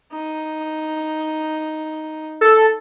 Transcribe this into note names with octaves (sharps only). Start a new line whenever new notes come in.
D#4
A4